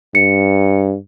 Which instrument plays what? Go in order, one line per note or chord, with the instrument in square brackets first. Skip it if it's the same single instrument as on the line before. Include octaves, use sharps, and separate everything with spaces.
[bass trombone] G2 [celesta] C#7